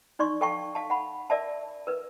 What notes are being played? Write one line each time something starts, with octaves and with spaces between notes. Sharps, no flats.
D#4 D5 C6 C#6
A4 F5 G5 A5 C#6
F5 A5
F#5 B5
A#4 D5 E5 A5
A#4 B4